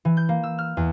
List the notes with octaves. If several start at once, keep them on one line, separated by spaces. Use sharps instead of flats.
E3
G6
A#3
E6
F6
E2